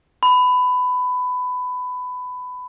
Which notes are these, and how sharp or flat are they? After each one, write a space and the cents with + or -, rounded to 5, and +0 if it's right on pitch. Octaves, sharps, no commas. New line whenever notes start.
B5 +20